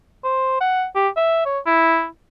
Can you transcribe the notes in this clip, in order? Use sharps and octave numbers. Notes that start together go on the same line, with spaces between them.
C5
F#5
G4
E5
C#5
E4